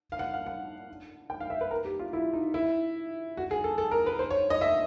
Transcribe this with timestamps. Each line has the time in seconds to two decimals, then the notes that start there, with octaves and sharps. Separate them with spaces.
0.12 F5
0.19 F#5
0.34 F5
0.46 F#5
1.30 G5
1.40 F5
1.50 E5
1.61 B4
1.71 A#4
1.84 G4
1.99 F4
2.13 E4
2.33 D#4
2.54 E4
3.37 F#4
3.51 G#4
3.64 A4
3.78 A4
3.91 A#4
4.06 B4
4.19 C5
4.31 C#5
4.50 D#5
4.61 E5